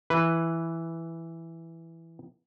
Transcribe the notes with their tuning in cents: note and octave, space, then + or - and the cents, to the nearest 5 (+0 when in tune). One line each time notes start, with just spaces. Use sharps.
E3 +0 B4 +0